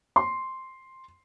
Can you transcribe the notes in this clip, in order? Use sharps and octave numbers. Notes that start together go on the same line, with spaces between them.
C6